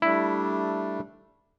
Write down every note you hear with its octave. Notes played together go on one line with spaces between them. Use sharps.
G3 A3 D4 E4